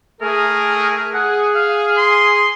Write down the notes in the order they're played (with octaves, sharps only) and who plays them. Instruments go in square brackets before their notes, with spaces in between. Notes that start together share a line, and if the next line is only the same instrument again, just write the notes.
[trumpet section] A3 G#4 [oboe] A#4
[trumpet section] G#4 [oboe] F#5
[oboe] F5
C6